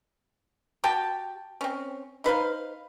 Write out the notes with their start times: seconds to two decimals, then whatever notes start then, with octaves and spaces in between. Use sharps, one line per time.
0.84 F#4 G4 G5 A5
1.61 C4 C#4
2.24 D#4 B4 C5 F5